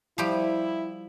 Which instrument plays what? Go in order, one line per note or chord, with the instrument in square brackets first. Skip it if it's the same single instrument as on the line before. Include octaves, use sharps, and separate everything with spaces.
[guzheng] F3 G3 G4 [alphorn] E4